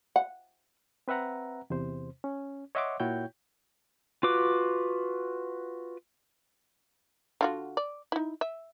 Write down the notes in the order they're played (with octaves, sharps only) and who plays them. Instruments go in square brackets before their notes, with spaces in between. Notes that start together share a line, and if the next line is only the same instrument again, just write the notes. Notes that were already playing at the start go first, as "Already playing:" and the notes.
[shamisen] F#5
[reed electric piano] C4 B4 E5 F#5 A#5
E2 C3 C5
C#4
C#5 D#5 E5 F#5 C6 D6
A#2 E4 F#4 C#5 G5 G6
[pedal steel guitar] F4 F#4 B4 D6
[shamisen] D3 F4 F#4
D5
D#4 E4
E5